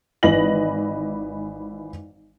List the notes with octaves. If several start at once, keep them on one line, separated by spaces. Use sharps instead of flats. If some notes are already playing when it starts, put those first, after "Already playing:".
G#1 E3 B4 D#5 A#6 F#7